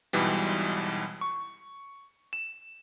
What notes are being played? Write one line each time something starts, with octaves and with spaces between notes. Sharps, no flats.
B1 G#2 B2 E3 G3
C#6
E7